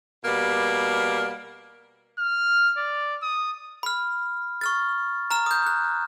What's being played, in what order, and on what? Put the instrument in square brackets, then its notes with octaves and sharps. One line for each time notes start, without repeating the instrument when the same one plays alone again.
[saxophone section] B2 G3 A#3
[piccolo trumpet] F6
D5
D#6
[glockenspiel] B5 F6
C#6 F6 A6
A#5 F6 E7
D#6 G6
F#6